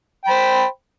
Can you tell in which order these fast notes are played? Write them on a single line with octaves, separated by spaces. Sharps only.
G5 B5 C5